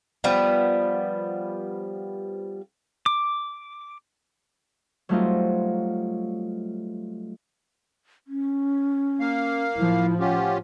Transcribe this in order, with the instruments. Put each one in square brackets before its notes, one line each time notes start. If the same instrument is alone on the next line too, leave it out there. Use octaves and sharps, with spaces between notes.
[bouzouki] F3 G3 B3
[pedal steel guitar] D6
[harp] F#3 G3 A3 C4 D#4 F4
[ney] C#4
[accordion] A#3 F5
[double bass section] A2 F3 [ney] E4
[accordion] C#4 F4 G4 [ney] F#5